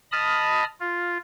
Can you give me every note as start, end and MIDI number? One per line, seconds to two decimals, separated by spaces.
0.12 0.64 75
0.12 0.64 81
0.12 0.64 83
0.12 0.64 87
0.12 0.64 89
0.80 1.17 65